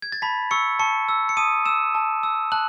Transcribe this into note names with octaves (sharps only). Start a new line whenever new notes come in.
G#6
A6
A5 B5 B6
C#6 E6 C#7
A5 C#6 C#7
E6
C#7
A5 D#6 D#7
E6 E7
A5
E6
A5 F#6 F#7